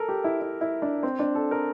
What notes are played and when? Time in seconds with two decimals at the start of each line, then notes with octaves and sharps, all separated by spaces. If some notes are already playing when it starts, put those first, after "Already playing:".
Already playing: A4 A#4
0.09 G4
0.24 E4
0.41 E4
0.61 E4
0.82 D4
1.03 C4
1.19 D4
1.35 A4
1.51 A#4